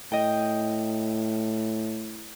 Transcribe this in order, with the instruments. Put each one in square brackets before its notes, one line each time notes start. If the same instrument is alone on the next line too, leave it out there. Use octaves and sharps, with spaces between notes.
[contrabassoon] A2 [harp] D#5 G5